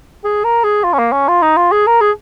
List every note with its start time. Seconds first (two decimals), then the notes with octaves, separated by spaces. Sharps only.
0.24 G#4
0.44 A#4
0.64 G#4
0.84 F4
0.93 C#4
0.99 A#3
1.12 C#4
1.28 F4
1.42 D#4
1.57 F4
1.72 G#4
1.87 A#4
2.01 G#4